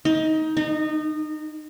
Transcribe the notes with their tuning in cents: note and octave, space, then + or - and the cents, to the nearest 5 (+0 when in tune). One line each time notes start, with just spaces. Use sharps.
D#4 +20
D#4 -25